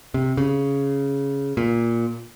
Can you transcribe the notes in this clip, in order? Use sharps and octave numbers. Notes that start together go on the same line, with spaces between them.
C3
C#3
A#2